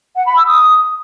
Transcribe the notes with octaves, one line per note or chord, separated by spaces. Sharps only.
F#5
B5
E6
D#6